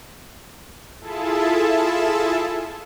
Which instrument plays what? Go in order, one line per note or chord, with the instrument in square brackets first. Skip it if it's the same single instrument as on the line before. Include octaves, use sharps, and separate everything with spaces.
[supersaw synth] E4 F4 G#4 A4 E5 A5